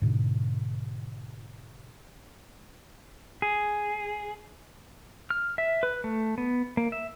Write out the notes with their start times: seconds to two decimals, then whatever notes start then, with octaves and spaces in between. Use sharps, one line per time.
0.02 G#2 B2 D3
3.42 G#4
5.30 F6
5.58 E5
5.83 B4
6.04 A3
6.38 B3
6.77 A#3
6.92 E5